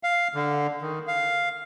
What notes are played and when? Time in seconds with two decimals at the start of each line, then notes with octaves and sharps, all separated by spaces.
0.03 F5
0.34 D3
0.82 D#3
1.07 F5